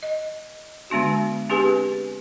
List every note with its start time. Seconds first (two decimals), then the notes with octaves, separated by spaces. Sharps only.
0.03 D#5
0.90 D3 G#3 B3 D4 F#4
1.50 C4 D4 G4 G#4 B4 G#5